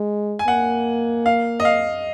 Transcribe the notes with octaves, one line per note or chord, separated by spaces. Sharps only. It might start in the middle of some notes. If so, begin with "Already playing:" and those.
Already playing: G#3
G#5
A#3 F#5
F5
D#5
F5